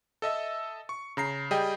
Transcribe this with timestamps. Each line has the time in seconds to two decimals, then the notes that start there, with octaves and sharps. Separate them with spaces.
0.22 A4 D#5 E5
0.89 C#6
1.17 C#3 A#5 C7
1.51 G3 G#4 D#5 G5